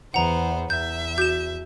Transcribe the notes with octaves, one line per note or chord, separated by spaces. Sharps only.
E2 B3 C5 F#5 A#5
E2 E5 G6
F#4 G6 E7